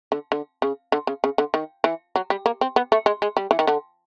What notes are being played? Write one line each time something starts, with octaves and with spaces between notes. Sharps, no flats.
D3
D3
C#3
D3
C#3
C#3
D3
D#3
E3
F#3
G3
A#3
C4
B3
A3
G#3
G#3
G3
E3
D#3
D3